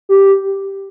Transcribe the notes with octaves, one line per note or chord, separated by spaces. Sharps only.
G4